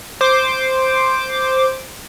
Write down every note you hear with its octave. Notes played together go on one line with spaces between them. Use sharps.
C5 D6